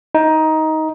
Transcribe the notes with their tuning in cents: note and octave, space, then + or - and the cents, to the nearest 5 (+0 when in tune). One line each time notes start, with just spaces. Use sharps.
D#4 +15